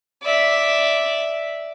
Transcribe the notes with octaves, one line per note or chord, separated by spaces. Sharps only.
D5 E5